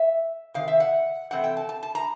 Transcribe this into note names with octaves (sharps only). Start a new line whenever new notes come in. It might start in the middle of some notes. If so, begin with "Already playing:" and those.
Already playing: E5
C3 D#3 F5
E5
F#5
C3 E3 A3 C4 F#5
G5
A5
A5
A5
A#5